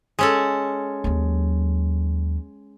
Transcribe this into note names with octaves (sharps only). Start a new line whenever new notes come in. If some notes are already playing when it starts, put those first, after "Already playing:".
G#3 C#4 A4
D#2 F#3